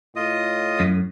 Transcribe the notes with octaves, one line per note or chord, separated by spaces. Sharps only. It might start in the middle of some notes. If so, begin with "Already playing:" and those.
A2 F4 D#5 D#6
F#2